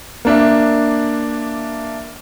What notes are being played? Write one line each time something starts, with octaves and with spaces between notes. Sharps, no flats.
A#3 D4 E5